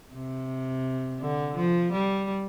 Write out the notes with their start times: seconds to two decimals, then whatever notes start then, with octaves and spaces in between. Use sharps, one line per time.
0.14 C3
1.21 D3
1.56 F3
1.92 G3